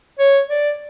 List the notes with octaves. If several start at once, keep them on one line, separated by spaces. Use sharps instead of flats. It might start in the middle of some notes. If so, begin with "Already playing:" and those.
C#5
D5